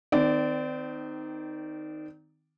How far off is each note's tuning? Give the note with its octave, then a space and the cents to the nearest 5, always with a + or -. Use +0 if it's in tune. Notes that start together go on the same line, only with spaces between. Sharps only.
D#3 +0 C4 -35 D5 -5